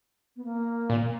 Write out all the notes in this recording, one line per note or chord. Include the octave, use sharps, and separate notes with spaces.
B3
A#3
A#2